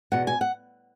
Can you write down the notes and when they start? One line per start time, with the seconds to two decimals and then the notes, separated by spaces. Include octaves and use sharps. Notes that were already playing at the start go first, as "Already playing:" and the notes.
0.12 E2 B2 F#5
0.27 G#5
0.41 F#5